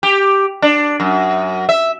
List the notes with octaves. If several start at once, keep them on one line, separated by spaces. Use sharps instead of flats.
G4
D4
F#2
E5